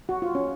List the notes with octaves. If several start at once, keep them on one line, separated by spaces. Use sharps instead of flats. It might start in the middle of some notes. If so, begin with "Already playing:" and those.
F#4
F4
C#4